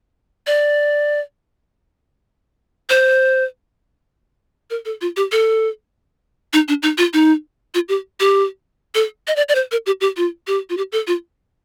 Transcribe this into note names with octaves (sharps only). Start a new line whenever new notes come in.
D5
C5
A#4
A4
F4
G4
A4
D#4
D4
D#4
F4
D#4
F4
G4
G4
A4
D#5
D5
D5
C5
A#4
G4
G4
F4
G4
F4
G4
A4
F4